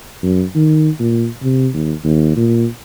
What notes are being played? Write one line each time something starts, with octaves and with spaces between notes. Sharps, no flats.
F#2
D#3
A#2
C3
D#2
D#2
A#2